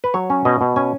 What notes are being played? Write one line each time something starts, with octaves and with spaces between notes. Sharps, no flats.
B4
F#3 C#5
C#4
B2 D#5
B2
C#4 G#5